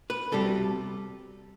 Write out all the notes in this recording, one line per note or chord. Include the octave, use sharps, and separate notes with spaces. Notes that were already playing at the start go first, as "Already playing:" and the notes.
B4
C2 B2 G3 C4 A4